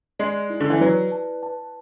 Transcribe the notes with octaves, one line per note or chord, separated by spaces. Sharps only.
G#3 D5
E4
D3
E3
F#3 B4
A5
A5